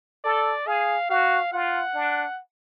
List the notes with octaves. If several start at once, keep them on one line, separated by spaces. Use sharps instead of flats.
A4 D5
G#4 F5
F#4 F5
F4 F#5
D4